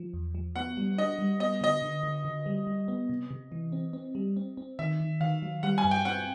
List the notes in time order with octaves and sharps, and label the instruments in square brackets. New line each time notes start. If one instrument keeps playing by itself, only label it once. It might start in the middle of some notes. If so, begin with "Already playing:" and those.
Already playing: [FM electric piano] F3
E2
F3
[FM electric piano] B3 [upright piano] F#5
[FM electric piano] G3
[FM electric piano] D4 [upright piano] D#5
[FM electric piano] G3
[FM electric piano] B3 [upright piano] D#5
[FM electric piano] D3 [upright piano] D#5
[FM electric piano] D3
D3
D3
G3
G3
B3
C3
C3
E3
C4
C4
G3
C4
C4
[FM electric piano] D#3 [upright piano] E5
[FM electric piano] D#3
[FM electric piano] D#3 [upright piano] F5
[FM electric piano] F#3
[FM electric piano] G3 [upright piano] F#5
[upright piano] G#5
[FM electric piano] G2
[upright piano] G5
[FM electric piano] C4 [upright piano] F#5